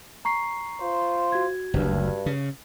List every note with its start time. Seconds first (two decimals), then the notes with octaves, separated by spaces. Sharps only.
0.25 A#5 C#6 C7
0.80 F4 C5
1.32 F#4 G#6
1.74 F#1 D2 G2
2.26 C#3